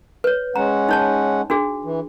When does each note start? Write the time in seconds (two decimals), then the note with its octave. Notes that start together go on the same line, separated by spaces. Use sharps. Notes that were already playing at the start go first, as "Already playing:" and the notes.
0.24 B4 C#5
0.56 G#3 C#4 F#5 A#5
0.89 D#4 C#5 A5
1.50 D4 F#4 G#4
1.84 E3